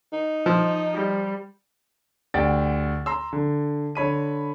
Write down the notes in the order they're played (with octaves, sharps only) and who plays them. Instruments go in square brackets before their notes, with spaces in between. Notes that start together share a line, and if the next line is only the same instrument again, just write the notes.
[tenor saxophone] D#4
[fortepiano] F3
[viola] G3
[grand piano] D2 G4 D5 F#5 G5 A6
A#5 C6 E6
D3
D3 C#5 B5 D#7